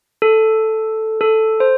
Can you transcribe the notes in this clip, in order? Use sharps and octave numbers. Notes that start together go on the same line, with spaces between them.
A4
A4
C5